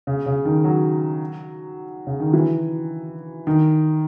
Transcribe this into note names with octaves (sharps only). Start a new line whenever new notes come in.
C#3
C#3
D#3
F#3
C#3
D#3
E3
D#3